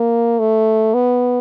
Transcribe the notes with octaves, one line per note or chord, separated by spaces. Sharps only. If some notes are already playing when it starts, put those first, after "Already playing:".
Already playing: A#3
A3
B3